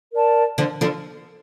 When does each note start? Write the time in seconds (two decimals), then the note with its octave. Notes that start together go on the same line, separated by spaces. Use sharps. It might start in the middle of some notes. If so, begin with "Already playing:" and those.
0.11 A#4 D5 A5
0.58 D3 F3
0.81 D3 F3